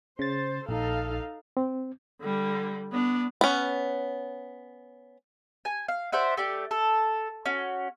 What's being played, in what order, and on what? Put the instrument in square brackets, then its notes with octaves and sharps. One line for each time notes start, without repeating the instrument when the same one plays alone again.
[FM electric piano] C#3 A6 [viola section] C5
[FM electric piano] A#1 [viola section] D#4 A4 F5
[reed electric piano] C4
[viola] D3 G3
B3 D4
[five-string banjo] B3 C#4
[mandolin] G#5
F5
C5 D5 E5 F#5
A3 G4 D5
A4
C#4 F#4